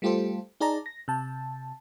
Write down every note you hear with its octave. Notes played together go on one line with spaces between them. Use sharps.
G3 A3 F4 G4 A4 C5
D#4 G#4 D5 A5 A#5
A#6
C3 A5